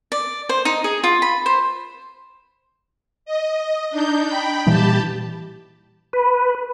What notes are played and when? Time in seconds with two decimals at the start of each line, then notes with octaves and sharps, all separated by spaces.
0.12 D5
0.49 C5
0.65 D#4
0.84 G#4
1.04 F4
1.22 B5
1.46 C5
3.26 D#5
3.91 D4 D#4 G6
4.26 G5 B5
4.67 A#2 E3 G3 G4 A5
6.13 B4